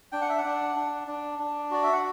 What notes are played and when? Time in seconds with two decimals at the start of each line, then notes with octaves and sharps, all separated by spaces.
0.12 D4 G5
0.21 F#5
0.29 E5
0.38 F#5
0.45 D4
0.76 D4
1.07 D4
1.39 D4
1.71 F#4 D5
1.83 E5
1.93 F#5